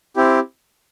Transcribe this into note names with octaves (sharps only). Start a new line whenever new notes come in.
C4 E4 G4